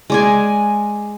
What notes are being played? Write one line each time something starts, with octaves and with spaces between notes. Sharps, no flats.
G#3 D5 G#5